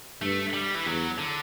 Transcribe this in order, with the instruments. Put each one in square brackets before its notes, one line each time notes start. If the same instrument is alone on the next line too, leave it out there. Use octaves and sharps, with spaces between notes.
[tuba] G2 [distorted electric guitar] A3
[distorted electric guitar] G3
E3
[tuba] E2 [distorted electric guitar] F#3
[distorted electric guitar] D3